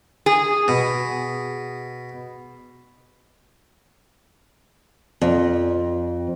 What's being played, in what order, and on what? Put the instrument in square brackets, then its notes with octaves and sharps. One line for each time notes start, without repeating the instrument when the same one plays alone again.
[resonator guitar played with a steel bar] G#4
[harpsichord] B2
[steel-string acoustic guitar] F2